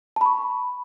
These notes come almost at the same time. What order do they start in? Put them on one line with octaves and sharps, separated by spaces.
A5 B5 C#6